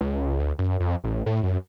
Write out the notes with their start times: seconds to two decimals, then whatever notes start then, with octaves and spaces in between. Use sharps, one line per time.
0.01 C#2
0.39 D2
0.59 F#2
0.80 F2
1.04 A1
1.26 A2
1.43 F#2